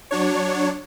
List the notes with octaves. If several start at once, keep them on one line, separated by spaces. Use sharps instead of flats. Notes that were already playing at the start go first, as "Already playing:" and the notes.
F#3 D4 C#5